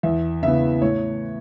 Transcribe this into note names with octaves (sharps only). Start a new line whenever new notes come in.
E2 E5
C#3 E3 B3 E5
A2 C#5